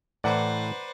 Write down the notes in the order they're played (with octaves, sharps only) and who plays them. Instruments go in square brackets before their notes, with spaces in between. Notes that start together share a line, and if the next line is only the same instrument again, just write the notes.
[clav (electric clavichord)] A2 E3 [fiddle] B4 C5 [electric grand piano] D5 F#5 A#5